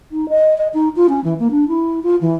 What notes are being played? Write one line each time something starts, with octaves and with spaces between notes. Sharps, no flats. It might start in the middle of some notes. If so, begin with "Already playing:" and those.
D#4
D#5
D#5
D#4
F4
C#4
E3
A#3
D4
E4
F4
E3